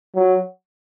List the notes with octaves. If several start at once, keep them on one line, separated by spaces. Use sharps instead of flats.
F#3